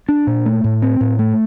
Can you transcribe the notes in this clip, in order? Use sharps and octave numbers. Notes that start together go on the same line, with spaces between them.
D4
A#2
A3
A2
C4
A2
A3